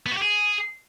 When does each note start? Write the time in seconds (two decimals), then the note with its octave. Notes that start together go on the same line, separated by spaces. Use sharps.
0.07 B3
0.12 F#4
0.17 G4
0.22 G#4